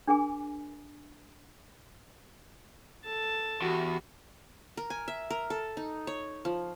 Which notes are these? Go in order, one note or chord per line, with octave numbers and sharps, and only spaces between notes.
D4 G#4 A#4 G#5 D6
A4 A5
E2 F#4 G4
A#4
G#5
E5
A#4
A4
D#4
C#5
F3